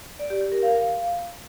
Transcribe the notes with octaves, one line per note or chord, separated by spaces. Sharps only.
D5
G4
G4
A#4
F5